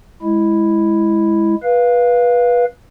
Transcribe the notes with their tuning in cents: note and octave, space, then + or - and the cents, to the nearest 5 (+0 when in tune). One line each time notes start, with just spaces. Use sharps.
G#3 +0 E4 +0
B4 -20 F5 +0